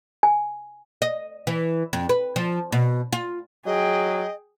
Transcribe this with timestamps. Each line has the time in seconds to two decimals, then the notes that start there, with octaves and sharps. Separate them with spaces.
0.23 G#5
1.02 D#5
1.47 E3
1.93 F2
2.09 B4
2.36 F3
2.72 B2
3.13 F4
3.66 F#3 G#4 D#5 G5